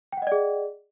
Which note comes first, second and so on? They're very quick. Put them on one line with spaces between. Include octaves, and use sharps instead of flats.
G5 F#5 D#5 D5 G#4